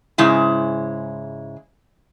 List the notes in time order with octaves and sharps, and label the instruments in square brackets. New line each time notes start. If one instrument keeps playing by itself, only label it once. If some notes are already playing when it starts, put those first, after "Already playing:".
[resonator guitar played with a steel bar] G#2 C#3 G#3 E4